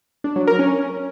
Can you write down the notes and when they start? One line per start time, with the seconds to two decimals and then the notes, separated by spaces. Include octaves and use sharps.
0.24 D4
0.36 F#3
0.47 A#4
0.59 C#4